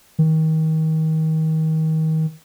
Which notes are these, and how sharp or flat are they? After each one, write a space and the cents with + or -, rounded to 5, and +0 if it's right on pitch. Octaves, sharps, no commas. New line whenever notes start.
D#3 +30